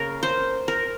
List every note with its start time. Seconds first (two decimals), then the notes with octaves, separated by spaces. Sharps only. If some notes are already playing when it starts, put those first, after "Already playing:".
Already playing: C#3 A#3 A#4
0.23 C5
0.68 A#4